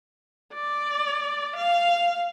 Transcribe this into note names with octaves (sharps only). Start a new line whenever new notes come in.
D5
F5